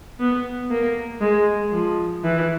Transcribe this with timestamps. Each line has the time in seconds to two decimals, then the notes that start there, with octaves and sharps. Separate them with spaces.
0.19 B3
0.70 A#3
1.21 G#3
1.72 F3
2.24 E3